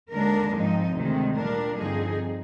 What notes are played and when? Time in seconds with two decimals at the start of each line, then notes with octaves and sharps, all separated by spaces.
0.11 D#2 D3 G#3 D4 A#4
0.53 G#2 F3 C4 D#4
0.96 D2 C3 D#3 G#3
1.37 A#2 G3 D4 A#4
1.79 G2 D3 F3 C4 D#4 G#4